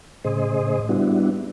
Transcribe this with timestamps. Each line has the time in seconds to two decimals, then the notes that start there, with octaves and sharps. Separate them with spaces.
0.24 A2 C#3 G#4 C5 D#5
0.89 G3 B3 D4 E4 F#4